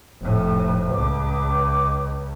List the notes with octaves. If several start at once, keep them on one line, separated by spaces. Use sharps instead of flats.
F1 A2
C#2 D6